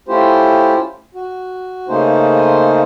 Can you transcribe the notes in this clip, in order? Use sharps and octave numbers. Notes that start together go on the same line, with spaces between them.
A3 C#4 E4 F4 G4 C5
F#4
C#3 A3 A#3 C#4 D#4 C5